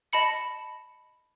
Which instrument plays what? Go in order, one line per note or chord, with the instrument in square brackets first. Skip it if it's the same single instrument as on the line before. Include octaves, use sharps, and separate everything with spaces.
[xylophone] D#5 A5 B5 C#7